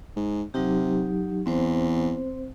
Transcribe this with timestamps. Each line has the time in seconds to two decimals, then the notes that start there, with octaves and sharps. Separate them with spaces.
0.16 G#2
0.54 C3 F#3 D#4 G4
1.46 E2 C4 C5